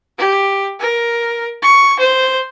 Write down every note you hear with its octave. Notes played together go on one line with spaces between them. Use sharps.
G4
A#4
C#6
C5